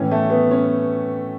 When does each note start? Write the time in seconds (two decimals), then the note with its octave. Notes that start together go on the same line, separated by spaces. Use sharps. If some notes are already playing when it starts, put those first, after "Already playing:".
Already playing: A2 E3 C#4
0.11 A3
0.30 B3
0.51 C#4